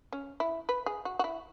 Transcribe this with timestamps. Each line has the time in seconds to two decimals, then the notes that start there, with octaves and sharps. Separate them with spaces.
0.12 C#4
0.40 E4
0.69 B4
0.86 G#4
1.05 F#4
1.19 F#4
1.24 E4